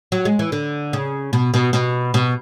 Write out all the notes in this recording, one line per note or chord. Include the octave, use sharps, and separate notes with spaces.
F#3
G#3
E3
D3
C#3
B2
B2
B2
B2